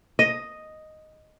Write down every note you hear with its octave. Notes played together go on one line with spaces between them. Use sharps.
D#5